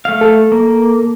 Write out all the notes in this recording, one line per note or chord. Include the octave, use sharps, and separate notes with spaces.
A3 F5
A4
A#3